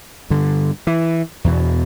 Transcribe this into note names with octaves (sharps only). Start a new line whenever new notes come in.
G2 D3
E3
E2 B2